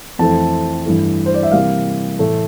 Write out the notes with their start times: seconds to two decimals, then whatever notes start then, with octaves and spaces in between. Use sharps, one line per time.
0.19 F2 E3 A3 C4 A5
0.86 G2 E3 A3
1.26 C5
1.34 D5
1.43 E5
1.52 C3 E3 G3 A#3 F5
2.19 A2 E3 A3